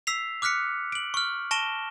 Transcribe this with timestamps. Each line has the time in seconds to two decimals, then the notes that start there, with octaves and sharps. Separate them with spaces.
0.07 E6 B6 C7 F7
0.42 D6 F6 F#6 B6 C#7
0.92 D7 F#7
1.14 C#6 F6
1.51 A5 C#6 A#6 D7 E7 G7